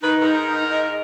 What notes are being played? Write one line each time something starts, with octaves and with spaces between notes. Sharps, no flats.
D#3 D#4 B4
G#2 A#4
D#5